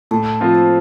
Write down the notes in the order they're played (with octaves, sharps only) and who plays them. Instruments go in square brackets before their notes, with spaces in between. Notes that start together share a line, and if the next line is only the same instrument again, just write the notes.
[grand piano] A2 [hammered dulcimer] A4
[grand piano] F3 C4 F4